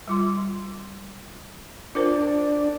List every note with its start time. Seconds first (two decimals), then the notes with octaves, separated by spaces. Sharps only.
0.08 G3 F4 C6
1.95 D4 F4 A#4 C5